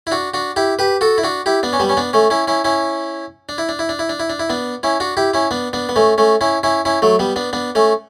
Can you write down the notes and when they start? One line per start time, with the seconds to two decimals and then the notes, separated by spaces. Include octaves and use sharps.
0.07 E4
0.11 D4 F#4
0.34 D4 F#4
0.56 E4 G4
0.79 G4 B4
1.01 F#4 A4
1.18 E4
1.24 D4 F#4
1.46 E4 G4
1.63 B3 D4
1.73 C#4
1.80 G3 B3
1.89 C#4
1.97 B3 D4
2.13 A3 C#4
2.30 C#4 E4
2.48 C#4 E4
2.64 C#4 E4
3.49 D4
3.58 E4
3.69 D4
3.79 E4
3.89 D4
3.99 E4
4.09 D4
4.20 E4
4.30 D4
4.39 E4
4.50 B3 D4
4.83 C#4 E4
5.00 D4 F#4
5.17 E4 G4
5.34 C#4 E4
5.51 B3 D4
5.73 B3 D4
5.89 B3
5.96 A3 C#4
6.18 A3 C#4
6.41 C#4 E4
6.63 C#4 E4
6.85 C#4 E4
7.02 F#3 A3
7.19 G3 B3
7.36 B3 D4
7.53 B3 D4
7.75 A3 C#4